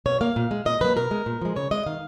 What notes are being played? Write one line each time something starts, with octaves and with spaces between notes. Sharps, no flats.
B2 C#5
A#3 F5
A#2
G#3
A#2 D#5
F#3 A#3 B4
B2 A#4
G#3
A#2
F3 G#3
C#3 C#5
G#3 D#5
D#3 F5